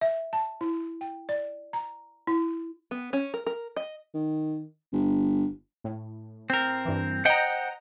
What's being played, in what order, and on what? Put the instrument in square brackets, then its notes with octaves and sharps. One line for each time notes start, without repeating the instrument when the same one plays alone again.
[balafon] E5
A5
E4
G5
D5
A#5
E4
[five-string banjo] B3
C#4
A#4
A#4
D#5
[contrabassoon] D#3
G1
[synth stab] A2
[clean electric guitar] C4 A#4
[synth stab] G2 E3
[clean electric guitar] C5 F#5 G5 [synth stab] D#5 A#5